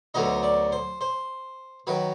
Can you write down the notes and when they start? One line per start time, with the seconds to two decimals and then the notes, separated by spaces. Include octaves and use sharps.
0.14 D2 D3 F#3 B3 D#4 D#5
0.43 D5
0.72 C5
1.01 C5
1.87 D#3 F#3 B4